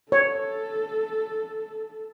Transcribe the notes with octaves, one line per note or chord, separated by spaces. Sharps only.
A4 C#5